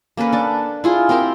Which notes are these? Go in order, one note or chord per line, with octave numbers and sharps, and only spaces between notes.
A#3 C#4 A4 B4
D4 A5
E4 F4 G#4
C4 G4 A#4 C5